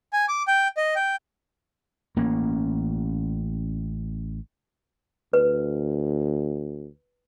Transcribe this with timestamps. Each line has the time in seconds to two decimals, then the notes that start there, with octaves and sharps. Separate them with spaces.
0.13 G#5
0.29 D6
0.48 G5
0.77 D#5
0.96 G5
2.16 A1 A#3 C#4
5.33 D2 B4